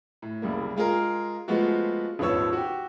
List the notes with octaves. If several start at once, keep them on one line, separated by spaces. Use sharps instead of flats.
A2
F#1 C2 G3 A#3
G#3 F4 G#4 A#4
F3 G#3 A3 B3 F4 F#4
D#1 G#1 F3 B3 C#5 E6
F#4 G4